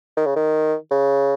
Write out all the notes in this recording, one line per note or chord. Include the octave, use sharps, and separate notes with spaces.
D#3
C#3
D#3
C#3